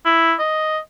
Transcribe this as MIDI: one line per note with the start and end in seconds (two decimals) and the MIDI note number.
0.06 0.34 64
0.39 0.79 75